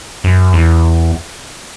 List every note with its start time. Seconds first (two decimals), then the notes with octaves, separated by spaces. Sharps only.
0.24 F#2
0.53 E2